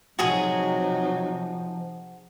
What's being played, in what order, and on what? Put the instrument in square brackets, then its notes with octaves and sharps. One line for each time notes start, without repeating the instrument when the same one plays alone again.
[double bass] C3 D#4 [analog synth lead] F3 [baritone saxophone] F#3 [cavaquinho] F#4 G#4 G#5